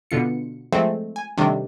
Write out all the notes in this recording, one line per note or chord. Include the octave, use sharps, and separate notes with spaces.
B2 D3 F4 C#7
F3 G#3 A3 C4
G#5
C3 D#3 G3 A3 D4